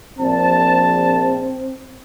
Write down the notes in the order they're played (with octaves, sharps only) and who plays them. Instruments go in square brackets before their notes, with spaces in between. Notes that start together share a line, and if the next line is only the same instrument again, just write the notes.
[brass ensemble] A#1 A5 [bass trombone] C4